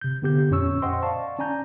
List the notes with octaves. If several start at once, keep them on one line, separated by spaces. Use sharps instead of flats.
C3 G6
D3 B3 G4 G6
F2 A#2 C#4 C#5 C#6 E6
C5 D#5 F#5 G5 C6
D5 F5 A5 C#6
C#4 D5 G#5 A#5 G6